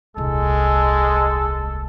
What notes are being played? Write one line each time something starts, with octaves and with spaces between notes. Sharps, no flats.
D#1 C2 G#3 A4